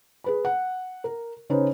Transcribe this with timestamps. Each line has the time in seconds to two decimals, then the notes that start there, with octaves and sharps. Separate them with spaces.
0.24 G#4 B4 B5
0.45 F#5
1.04 A#4
1.50 C#3 C#4 D#4 B4 C5